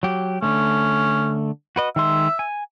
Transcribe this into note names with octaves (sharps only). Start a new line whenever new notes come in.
F#3 G4
D3 A3 C#4
F#4 B4 D#5
D#3 G#3 E5 C6
G#5